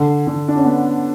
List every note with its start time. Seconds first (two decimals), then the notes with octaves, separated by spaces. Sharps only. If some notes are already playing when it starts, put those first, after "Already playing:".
Already playing: D3
0.27 D3
0.48 D4
0.57 C#4
0.65 B3